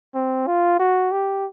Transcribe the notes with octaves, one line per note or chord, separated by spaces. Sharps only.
C4
F4
F#4
G4